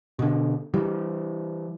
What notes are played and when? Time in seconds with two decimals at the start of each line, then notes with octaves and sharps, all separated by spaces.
0.19 B2 D3
0.74 E3 G3